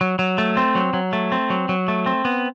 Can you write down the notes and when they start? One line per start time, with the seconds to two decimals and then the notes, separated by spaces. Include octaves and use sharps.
0.01 F#3
0.19 F#3
0.38 A3
0.57 C4
0.75 F#3
0.93 F#3
1.13 A3
1.32 C4
1.50 F#3
1.69 F#3
1.88 A3
2.06 C4
2.25 B3